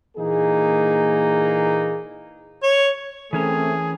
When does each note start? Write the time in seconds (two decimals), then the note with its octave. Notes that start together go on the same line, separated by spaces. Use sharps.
0.17 A#2 E3 A#3 D#4 G#4
2.63 C#5
3.33 E3 A3 C4 C#4 G#4 A#4